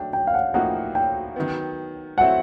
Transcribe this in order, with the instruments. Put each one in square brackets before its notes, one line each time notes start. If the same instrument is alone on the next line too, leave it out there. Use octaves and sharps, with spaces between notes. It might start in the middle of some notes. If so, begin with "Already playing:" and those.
Already playing: [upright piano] F#3 A3 D4 [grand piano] G5
[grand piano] G5
F5
F#5
[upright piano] A2 F3 A#3 D#4 F#4 [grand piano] F#5
[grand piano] G5
[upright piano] D#3 F#3 B3
[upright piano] A2 F#3 A3 C4 E4 [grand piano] F#5